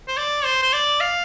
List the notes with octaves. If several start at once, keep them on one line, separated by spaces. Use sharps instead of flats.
C5
D5
C5
C5
D5
F5